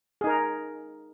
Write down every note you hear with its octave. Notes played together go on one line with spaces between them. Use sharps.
D#4 G#4 A#4